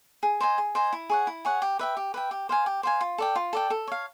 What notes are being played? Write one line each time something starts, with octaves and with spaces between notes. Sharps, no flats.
G#4
C5 D#5 G#5
G#4
C5 D#5 G#5
E4
G#4 C#5 F#5
E4
G#4 C#5 F#5
G4
B4 E5 G5
G4
B4 E5 G5
G4
C5 F5 G#5
G4
C5 F5 G#5
F4
A4 D5 G5
F4
A4 D5 G5
A4
C#5 F5